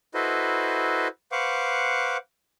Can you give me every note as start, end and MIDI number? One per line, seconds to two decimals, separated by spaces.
0.14 1.08 64
0.14 1.08 66
0.14 1.08 69
0.14 1.08 71
0.14 1.08 72
0.14 1.08 75
1.32 2.17 71
1.32 2.17 72
1.32 2.17 77
1.32 2.17 78
1.32 2.17 85
1.32 2.17 86